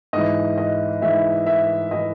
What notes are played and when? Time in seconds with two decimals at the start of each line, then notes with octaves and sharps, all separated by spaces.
0.13 G#2 E3 D#5
0.58 D#5
1.01 G#2 E3 E5
1.46 E5
1.91 E3 D#5